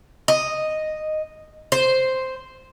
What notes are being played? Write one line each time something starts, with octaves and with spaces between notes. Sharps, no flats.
D#5
C5